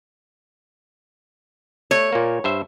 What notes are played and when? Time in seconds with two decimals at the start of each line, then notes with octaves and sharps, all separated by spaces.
1.91 A3 C#5
2.12 A#2 A#3
2.44 G2 C5 E5